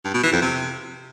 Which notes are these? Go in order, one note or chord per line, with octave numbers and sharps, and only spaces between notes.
G2
B2
E3
F2
C3